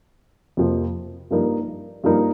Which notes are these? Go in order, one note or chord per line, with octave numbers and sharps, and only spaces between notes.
F2 C3 F3 A#3 F4
G2 F3 A#3 D#4 A#4
G2 F3 A#3 D#4 A#4